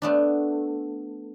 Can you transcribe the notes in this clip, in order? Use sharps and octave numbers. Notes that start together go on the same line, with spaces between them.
A3 B3 D4